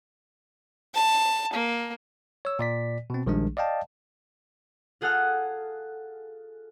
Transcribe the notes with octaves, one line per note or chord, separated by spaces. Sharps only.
A5
A#3
C#5 E6
A#2 D5 B6
B2 C4
A#1 D#3 G3 G#3 D4
D5 D#5 F5 G5 A5
F4 G#4 A4 F#5 D#6 F6